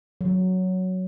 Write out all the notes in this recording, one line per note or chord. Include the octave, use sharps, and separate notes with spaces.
F#3